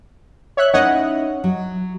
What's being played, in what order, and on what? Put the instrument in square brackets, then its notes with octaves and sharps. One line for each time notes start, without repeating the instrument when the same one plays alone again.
[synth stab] C#5 E5 F#6
[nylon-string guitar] C#4 D#4 E4 [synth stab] C#5 D#5 F#5
[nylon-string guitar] F#3